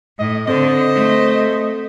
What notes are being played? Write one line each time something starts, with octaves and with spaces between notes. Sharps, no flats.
A2 D#5
D3 C4 A4 C5 D#5
A3